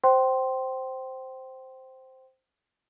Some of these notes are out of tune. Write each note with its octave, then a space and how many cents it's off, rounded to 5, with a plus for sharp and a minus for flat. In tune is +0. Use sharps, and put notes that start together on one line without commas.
C5 +0 G5 -25 C6 +0